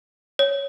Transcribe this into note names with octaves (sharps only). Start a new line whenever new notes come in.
C#5